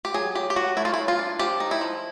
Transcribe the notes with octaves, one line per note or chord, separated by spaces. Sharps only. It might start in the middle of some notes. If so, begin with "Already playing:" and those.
G4
F#3 G#4
F#3 G4
G4
F#3 F#4
A3 E4
F4
F#3 E4
F4
D4
F3 G4
D#4
E4
F3